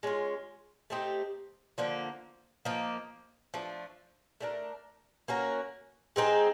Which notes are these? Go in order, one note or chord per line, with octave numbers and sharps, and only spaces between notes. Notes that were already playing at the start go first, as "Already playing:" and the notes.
G#3 C#4 F4
A3 C4 D#4 G4
D3 F3 A#3
F3 A#3 D#4
F3 A3 D4
A3 D4 G4 A#4
A#3 C#4 F#4 A#4
G#3 C4 D#4 G#4